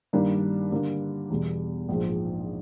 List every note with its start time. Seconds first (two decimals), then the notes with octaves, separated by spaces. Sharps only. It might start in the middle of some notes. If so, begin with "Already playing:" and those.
0.13 G2 D#3 G3 A#3 D4
0.72 D3 G3 A#3
1.30 E2 B2 G3
1.89 A#1 G#2 F3